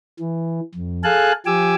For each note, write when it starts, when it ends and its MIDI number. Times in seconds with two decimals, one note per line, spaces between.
0.19 0.60 52
0.75 1.03 41
1.04 1.32 68
1.04 1.32 69
1.04 1.32 77
1.04 1.32 80
1.04 1.32 81
1.04 1.32 90
1.46 1.75 53
1.46 1.75 67
1.46 1.75 80
1.46 1.75 86
1.46 1.75 88